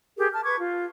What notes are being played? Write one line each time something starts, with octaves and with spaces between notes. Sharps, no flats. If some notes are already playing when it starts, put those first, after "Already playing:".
G4 G#4 A#4
A5 F6
B4 C#6 D6 G#6
F4